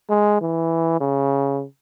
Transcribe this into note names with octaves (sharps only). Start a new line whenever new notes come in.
G#3
E3
C#3